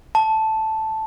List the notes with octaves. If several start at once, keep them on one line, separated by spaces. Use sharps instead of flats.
A5